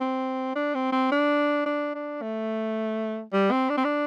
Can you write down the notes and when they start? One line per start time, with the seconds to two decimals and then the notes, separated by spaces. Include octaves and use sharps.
0.01 C4
0.55 D4
0.75 C4
0.92 C4
1.11 D4
1.66 D4
1.94 D4
2.22 A3
3.33 G3
3.51 C4
3.69 D4
3.77 C4
3.84 D4